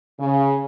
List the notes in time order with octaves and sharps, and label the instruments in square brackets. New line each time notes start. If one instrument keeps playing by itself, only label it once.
[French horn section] C#3